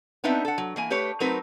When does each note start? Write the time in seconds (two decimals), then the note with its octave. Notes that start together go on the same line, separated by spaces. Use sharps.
0.24 B3 C4 D4 D#4 B4 E5
0.45 A4 F#5
0.58 F#3
0.76 E3 A#3 G#5
0.90 A3 G4 B4 C#5
1.20 F#3 A3 C4 D#4 A#4 B4